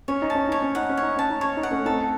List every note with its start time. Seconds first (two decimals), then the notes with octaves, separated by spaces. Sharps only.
0.08 C#4 C#5
0.22 D#4
0.30 A5
0.35 C#4
0.49 D#4 C#5
0.62 C#4
0.75 D#4 F#5
0.89 C#4
0.97 C#5
1.03 D#4
1.17 C#4 A5
1.30 D#4
1.41 C#4 C#5
1.57 D#4
1.63 F#5
1.71 A3 C#4
1.85 C4 D#4 A4